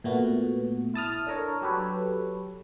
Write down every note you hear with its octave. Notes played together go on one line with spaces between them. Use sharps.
A#2 A3 B3 F#4
E4 A5 D#6 F6
D4 A4 A#4 C#5
F#3 G4 A4 B4 C#5